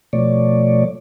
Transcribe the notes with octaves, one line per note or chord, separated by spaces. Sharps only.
B2 F3 A3 C#5 D5